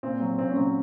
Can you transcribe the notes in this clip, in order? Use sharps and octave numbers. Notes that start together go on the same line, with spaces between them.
A#2 C4
F#3
A#2 C4
C#4
F#3 C4